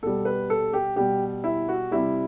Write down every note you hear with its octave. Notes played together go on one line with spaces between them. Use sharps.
B2 G3 A4
B4
A4
G4
B2 G3 G4
E4
F#4
C3 G3 E4